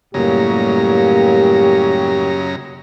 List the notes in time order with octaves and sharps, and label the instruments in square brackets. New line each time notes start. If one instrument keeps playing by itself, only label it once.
[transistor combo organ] F#2 C#3 A#5 [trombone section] A2 G3 A#3 [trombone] G4